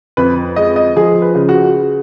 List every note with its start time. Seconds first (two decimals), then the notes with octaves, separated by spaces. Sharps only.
0.17 F2 B4
0.56 G#3 D#5
0.76 D#5
0.96 F3 G#4
1.22 B4
1.35 C#3
1.49 F#4